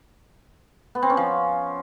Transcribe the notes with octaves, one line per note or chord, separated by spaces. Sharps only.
B3
C4
C#4
F3